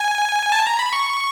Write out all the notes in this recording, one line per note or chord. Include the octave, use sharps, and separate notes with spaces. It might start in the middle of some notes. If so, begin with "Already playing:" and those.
Already playing: G#5
A5
A#5
B5
C#6